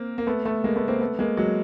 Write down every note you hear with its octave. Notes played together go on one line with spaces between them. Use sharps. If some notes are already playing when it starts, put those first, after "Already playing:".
Already playing: A#3 C4
A#3
A3 B3
A3 B3
G#3 A#3
A3 B3
A#3 C4
A3 B3
G#3 A#3
F#3 G#3